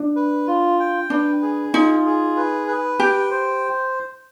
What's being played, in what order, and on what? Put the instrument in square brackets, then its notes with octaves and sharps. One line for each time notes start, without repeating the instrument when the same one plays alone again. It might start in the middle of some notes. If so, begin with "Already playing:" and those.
Already playing: [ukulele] D4
[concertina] B4
F4
G5
[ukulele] D4 [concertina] B4
[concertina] G#4
[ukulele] D#4 [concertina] F4
[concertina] G#4
B4
B4
[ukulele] G4 [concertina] G5
[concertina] C5